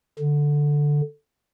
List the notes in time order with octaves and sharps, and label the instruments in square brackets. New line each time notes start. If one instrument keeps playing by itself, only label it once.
[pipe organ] D3